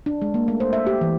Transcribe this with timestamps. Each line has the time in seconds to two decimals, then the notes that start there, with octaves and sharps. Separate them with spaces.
0.06 D4
0.22 G#3
0.34 A#3
0.48 A3
0.60 C5
0.73 E5
0.87 G4
1.01 E3